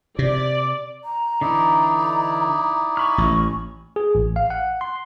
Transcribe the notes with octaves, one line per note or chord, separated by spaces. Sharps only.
C3 D5
A#5
D3 E3 D#4 E4 D5
G#5 B5 C#6 F6
A1
G#4
A1
F5
F#5
C6